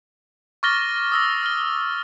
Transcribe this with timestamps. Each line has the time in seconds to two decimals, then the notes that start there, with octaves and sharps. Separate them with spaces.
0.63 C#6 D6 F6 A6 A#6 G7
1.12 D#6 E6 A#6
1.43 F6 G7